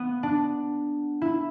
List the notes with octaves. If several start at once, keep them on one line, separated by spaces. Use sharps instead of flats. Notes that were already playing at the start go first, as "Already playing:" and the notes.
Already playing: B3
D4
E4